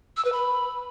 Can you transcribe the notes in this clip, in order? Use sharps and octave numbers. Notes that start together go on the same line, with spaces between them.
E6
B4
B5